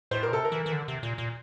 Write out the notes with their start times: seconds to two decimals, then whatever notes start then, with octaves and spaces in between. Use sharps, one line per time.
0.11 A2 C5
0.23 A#2 A#4
0.32 C3 A4
0.45 A#4
0.52 E3
0.66 E3
0.72 D3
0.88 C3
1.03 A#2
1.18 A#2